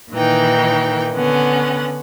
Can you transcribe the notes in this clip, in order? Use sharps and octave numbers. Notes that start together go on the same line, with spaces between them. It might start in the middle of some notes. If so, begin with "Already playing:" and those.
A#2 D#3 E3 D#4 G5
D3 B3 C#4 F#5